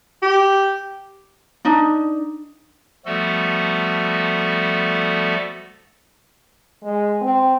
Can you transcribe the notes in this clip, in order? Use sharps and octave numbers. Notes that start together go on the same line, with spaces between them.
G4
D4 D#4
F3 G3 A3 B3 F#4 A4
G#3
C4